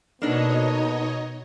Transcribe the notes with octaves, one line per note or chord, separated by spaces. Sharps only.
B2 A#3 B3 D4 D#4 A4 C#5 D#5